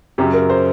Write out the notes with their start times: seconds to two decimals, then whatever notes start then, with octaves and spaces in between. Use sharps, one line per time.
0.18 F#2 C#3 F#3 G4
0.33 A#4
0.50 C5